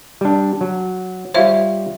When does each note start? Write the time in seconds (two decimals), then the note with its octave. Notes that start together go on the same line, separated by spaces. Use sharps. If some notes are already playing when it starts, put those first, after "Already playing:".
0.21 G3 D4
0.61 F#3
1.34 G3 F4 C5 C#5 E5 F5